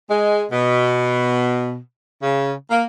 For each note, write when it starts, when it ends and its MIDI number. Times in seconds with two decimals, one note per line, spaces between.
0.09 0.43 56
0.51 1.77 47
2.23 2.51 49
2.70 2.84 58